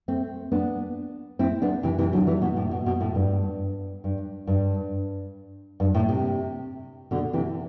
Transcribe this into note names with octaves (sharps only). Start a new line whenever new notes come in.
A3 C4
B3 D4
C4 E4
B3 D4
C3 E3
C3 E3
D3 F#3
E3 G3
B2
A2
B2
B2
A2
G2
G2
G2
G2
A2
C3
B2 D3
C3 E3